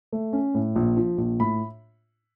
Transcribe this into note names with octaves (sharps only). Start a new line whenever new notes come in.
A3
C#4
A2
A#1
F3
A#1
A2 B5